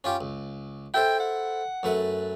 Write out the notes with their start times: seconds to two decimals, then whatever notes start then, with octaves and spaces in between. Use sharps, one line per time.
0.04 C#4 F4 G4
0.21 C#2
0.94 E4 A4 C5 G5
1.20 F#5
1.83 F#2 A3 B4